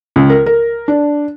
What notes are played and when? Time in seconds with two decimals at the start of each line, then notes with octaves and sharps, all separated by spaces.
0.16 C#2
0.30 A#4
0.46 A#4
0.88 D4